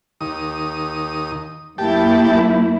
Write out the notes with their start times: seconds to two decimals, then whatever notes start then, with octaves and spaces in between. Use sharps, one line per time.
0.21 D#2 D#6
1.78 F#2 A#3 E4 G4 A5